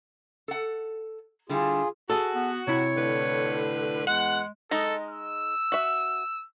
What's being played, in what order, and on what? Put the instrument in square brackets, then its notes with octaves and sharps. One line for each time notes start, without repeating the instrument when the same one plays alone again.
[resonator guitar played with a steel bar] A4 F#5
[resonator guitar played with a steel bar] D3 G3 E4 [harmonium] F4 G#4
[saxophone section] F#4 [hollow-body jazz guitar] G#4 A4
[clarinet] B3
[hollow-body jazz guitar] C3 E4 [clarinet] C#5
[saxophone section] A2 D3 B4
[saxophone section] E2 F#5 [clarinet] G#3
[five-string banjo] G#3 D#4 D#5 [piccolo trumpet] A4
[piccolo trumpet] E6
[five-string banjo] F#4 E5